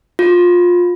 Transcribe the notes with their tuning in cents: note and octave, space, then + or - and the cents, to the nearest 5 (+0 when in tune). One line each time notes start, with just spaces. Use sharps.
F4 +20